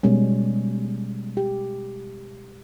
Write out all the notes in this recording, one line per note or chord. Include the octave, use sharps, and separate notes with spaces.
B2 G3 G#3 C#4
G4